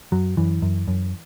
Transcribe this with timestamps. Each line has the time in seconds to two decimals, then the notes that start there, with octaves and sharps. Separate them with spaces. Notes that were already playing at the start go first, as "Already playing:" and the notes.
0.12 F#2 F#3
0.37 F#2 E3
0.62 F#2
0.88 F#2